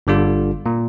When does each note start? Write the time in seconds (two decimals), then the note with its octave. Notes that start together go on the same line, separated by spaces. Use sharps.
0.07 G1 D3 G3 F4
0.66 A#2